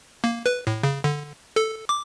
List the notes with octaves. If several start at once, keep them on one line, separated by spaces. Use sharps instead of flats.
A#3
B4
A2
C#3
D3
A4
D6